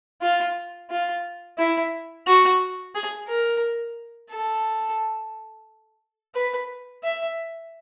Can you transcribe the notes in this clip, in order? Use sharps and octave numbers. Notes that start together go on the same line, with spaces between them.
F4
F4
E4
F#4
G#4
A#4
A4
B4
E5